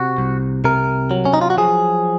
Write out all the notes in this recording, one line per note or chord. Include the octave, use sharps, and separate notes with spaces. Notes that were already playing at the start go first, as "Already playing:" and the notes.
Already playing: C3 F#4
C2
C3 A#4
F#3
C#4
D#4
F4
F#4
F3 G#4